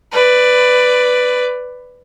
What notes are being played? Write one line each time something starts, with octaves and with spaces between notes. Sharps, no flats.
B4 D5